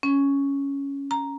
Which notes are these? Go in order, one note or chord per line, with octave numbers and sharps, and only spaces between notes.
C#4
A#5